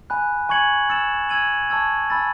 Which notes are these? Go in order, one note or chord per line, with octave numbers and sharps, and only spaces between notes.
G#5 B5 F#6
G#5 C#6 G#6 C#7 F#7
E6 A6 C#7 E7
E6 G#6 D#7 F#7
A5 C#6 E6 G#6
G#5 B5 E6 A6